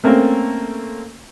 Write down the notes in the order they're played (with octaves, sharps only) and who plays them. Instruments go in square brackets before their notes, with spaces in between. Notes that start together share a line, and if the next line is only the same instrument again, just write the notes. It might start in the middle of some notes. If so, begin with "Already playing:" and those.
[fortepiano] A3 A#3 C4 C#4 A#4